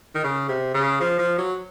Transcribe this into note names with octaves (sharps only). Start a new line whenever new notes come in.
D#3
C#3
C3
C#3
F3
F3
F#3